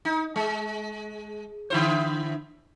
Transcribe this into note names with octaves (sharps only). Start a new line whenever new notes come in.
D#4
G#3
D3 E4 C5